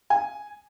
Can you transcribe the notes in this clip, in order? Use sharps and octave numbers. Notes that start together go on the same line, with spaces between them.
G#5